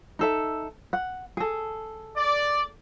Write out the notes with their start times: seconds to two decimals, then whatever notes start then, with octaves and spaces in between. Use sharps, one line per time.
0.19 D#4 A4 E5
0.93 F#5
1.37 G#4 A4
2.17 D5